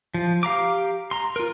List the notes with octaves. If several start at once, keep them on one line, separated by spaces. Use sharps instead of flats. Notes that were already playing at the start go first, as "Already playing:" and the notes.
F3
G4 F5 A#5 D6
A#5 C6
F4 A#4